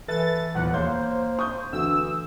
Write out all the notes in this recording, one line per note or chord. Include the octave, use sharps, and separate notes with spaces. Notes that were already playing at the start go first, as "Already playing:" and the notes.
E3 A4 B4 E5 A6
D#1 E2 F3 F#5
A#3 C5 C#5 G6
C#6 D#6 G6
D2 E3 E6